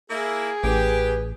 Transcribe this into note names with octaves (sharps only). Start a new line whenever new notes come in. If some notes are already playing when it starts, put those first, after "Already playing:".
A#3 E4 G#4
A1 G4 B4